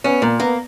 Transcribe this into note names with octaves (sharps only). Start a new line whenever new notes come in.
B3 C#4
A#2 A#3
A#3 B3